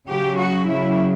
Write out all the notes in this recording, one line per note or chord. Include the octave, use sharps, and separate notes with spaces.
C#3 F#3 G4
F#4
C#3 F#3 E4